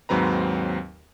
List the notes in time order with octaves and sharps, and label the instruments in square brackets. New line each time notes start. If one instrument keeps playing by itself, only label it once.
[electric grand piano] D#2 G#2 F#3 C4 B4 A#5